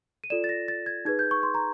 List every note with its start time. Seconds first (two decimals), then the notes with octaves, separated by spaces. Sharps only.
0.24 D#7
0.30 F4 A4 D5 E7
0.44 A6
0.49 A#6
0.68 A6
0.86 G#6
1.05 D#4 G#4 B4 G#6
1.19 G6
1.31 C#6
1.43 C6
1.54 A#5